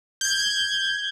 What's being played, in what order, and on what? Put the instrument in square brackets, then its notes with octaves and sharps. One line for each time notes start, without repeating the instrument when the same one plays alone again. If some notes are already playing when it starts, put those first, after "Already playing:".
[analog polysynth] G6 G#6